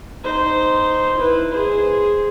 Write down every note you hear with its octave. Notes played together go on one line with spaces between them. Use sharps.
D#4 C5
E4 B4
G#4 C5